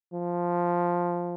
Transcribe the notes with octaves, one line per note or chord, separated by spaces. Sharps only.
F3